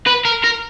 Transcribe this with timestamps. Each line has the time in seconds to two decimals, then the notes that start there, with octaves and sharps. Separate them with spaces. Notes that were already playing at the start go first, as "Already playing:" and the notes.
0.07 B4
0.25 A#4
0.44 A#4